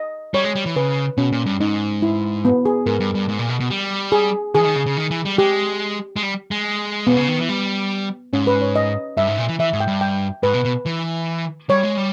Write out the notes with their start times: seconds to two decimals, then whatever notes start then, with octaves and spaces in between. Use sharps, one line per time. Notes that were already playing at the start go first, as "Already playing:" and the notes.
Already playing: D#5
0.34 G3 C#5
0.44 G#3
0.55 G3
0.66 E3
0.76 C#3 B4
1.18 B2 C#4
1.32 A#2
1.46 G2
1.60 G#2 D#4
2.02 E4
2.45 B3
2.65 G#4
2.86 G#2 A#4
3.00 G2
3.14 G2
3.28 G#2
3.39 A#2
3.49 B2
3.60 B2
3.71 G3
4.12 G#4
4.55 D#3 G#4
4.60 E3
4.65 D#3
4.76 C#3
4.86 C#3
4.97 D#3
5.11 E3
5.25 G3
5.38 G#3 G4
6.16 G#3
6.23 G3
6.51 G#3
7.07 B2 B3
7.17 C#3
7.28 D#3
7.39 E3
7.49 G3
8.33 G#2 C#4
8.47 B4
8.61 C#5
8.76 D#5
9.17 G2 E5
9.27 G#2
9.38 A#2
9.49 E3
9.59 E3 E5
9.73 G#2
9.80 G5
9.87 G2
10.01 G5
10.43 G#2 B4
10.54 B2
10.65 B2
10.86 E3
11.70 G3 C#5
11.83 G#3
11.97 G3